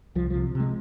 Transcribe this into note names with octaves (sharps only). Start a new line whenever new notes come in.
C2 F3
C3 F3
C3 G#3